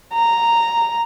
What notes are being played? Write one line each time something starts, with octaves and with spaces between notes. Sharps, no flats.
A#5